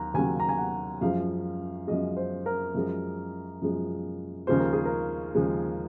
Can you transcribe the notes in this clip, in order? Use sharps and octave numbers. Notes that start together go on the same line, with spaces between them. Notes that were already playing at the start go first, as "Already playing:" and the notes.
Already playing: D#2 F#3 A#5
D#2 C#3 F#3 G#5
A#5
G#5
F#5
F#2 F3 G#3 F5
F#2 F3 G#3 D#5
C5
A#4
F#2 F3 G#3
F#2 F3 G#3
D#2 C#3 F3 G#3 C5
A#4
G#4
A#4
D#2 C#3 F3 G#3